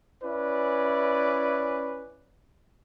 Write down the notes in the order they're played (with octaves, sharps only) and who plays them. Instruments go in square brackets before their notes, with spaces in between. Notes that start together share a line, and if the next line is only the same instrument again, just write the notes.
[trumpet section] C#4 E4 B4 D5